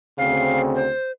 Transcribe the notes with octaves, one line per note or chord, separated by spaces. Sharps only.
D2 C#3 C4 F5
C5